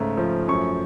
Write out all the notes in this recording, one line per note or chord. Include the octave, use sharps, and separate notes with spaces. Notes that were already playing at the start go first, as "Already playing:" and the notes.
Already playing: G#2 C#3 A3
F3
F#2 C#6